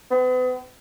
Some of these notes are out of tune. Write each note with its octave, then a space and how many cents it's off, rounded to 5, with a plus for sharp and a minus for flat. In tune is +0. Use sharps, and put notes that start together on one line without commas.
B3 +40